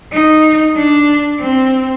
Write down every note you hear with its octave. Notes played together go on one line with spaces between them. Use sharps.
D#4
D4
C4